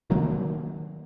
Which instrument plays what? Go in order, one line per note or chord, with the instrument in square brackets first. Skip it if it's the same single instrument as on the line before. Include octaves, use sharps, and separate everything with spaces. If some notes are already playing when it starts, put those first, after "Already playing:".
[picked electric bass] C3 D#3 F#3 A#3